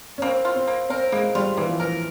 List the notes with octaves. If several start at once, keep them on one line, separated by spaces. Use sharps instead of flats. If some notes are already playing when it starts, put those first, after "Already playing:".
C#4
A#3 C4
F4
C4
A#3
C4 A#4
G#3 A#3
G3 F4
E3 A#3
F3
E3 A#4